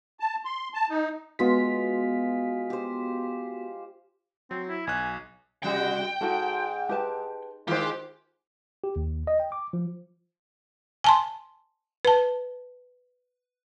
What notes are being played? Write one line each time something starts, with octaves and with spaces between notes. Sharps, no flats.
A5
C6
A5
D#4
G#3 B3 F4 F#4 B6
G4 C5
F#3 C4
E4
B1 G#5 F#6
C3 G3 F#4 G5
G#2 F#4 A4
G4 B4 A5
D#3 G#3 F4 G4 C5
G4
D#2
D#5
G5
D6
F3
G#5 A5 C6
B4 A5